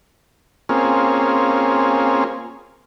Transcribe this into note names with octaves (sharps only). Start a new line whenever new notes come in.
A#3 C4 C#4 F4 G#4